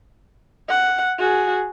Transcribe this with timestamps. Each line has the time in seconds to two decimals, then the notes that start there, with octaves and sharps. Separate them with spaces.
0.70 F#5
1.19 F#4 G#4